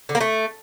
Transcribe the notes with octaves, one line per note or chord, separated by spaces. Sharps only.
D3
A#3
A3